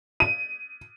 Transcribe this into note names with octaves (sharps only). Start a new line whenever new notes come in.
D#7